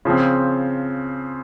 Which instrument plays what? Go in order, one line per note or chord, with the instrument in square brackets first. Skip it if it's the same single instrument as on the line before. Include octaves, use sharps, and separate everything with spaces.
[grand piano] C#3 F3 C4